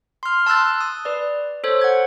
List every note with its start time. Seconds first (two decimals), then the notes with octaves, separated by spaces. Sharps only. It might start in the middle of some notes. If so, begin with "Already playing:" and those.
0.23 C6 F6
0.46 A5 C6 E6 F#6 A6
0.81 D#6
1.05 B4 D5
1.64 A4 C5 C#5
1.81 F#5 G#6